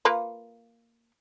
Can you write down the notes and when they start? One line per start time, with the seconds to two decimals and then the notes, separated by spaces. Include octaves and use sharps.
0.05 A#3 F4 B4